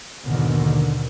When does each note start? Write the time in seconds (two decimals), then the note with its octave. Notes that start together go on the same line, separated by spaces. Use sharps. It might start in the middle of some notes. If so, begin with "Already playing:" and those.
0.25 D#2 G#2 B2 D3 D#3